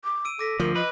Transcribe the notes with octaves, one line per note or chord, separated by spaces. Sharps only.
D6
E6 D7 D#7
A4 D6 A#6 B6
D2 F3 A#4
B4 D#5